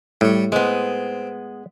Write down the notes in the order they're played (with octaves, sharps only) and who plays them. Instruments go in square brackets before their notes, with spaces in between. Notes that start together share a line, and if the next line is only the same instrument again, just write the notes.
[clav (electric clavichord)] A2 [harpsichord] G3 C#5
[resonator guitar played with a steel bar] G#3 B3 [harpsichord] C4